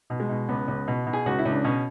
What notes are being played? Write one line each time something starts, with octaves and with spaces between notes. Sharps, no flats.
B2
G#3
B2
C#2 B3
C#2
B2
B2
G#4
C#2 F#4
E4
C#2
D4
B2 C#4